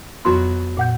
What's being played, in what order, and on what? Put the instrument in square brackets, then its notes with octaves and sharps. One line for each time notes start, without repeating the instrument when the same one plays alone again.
[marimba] F2 C6 [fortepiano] B2 F#3
[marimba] A#2 F#5 G6